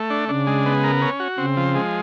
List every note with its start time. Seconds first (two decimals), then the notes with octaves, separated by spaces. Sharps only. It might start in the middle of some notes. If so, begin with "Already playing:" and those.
Already playing: A3
0.10 D4
0.29 C#3 D4
0.47 G#3
0.66 B3
0.84 A#4
1.02 C#4
1.20 F#4
1.38 C#3 C4
1.57 F3
1.75 G#3